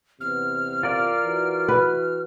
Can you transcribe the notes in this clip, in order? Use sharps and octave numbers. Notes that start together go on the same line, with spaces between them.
E2 C3 B3 F6
F4 A#4 D5
E3 F#4
B4